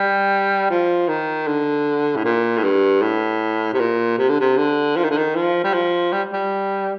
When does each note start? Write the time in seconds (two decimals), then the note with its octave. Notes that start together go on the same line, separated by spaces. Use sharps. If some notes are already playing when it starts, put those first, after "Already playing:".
Already playing: G3
0.70 F3
1.08 D#3
1.47 D3
2.16 A2
2.25 A#2
2.57 A2
2.64 G2
3.02 A2
3.73 C3
3.79 A#2
4.18 C3
4.29 D3
4.40 C3
4.57 D3
4.96 F3
5.04 D#3
5.10 D3
5.17 D#3
5.35 F3
5.64 G3
5.73 F3
6.12 G3
6.33 G3